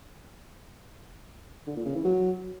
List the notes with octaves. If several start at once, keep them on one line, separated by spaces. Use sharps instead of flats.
D3
A#2
C#3
E3
F#3